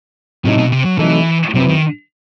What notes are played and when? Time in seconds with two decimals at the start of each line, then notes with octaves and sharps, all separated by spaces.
0.44 A2 C3 F#3 A3 D#4 A4
0.58 B2
0.72 C3
0.85 F#3
0.99 C3 E3 F#3 A3 D#4 A4
1.54 F#2 C3 F#3 C4 E4 B4
1.68 D#3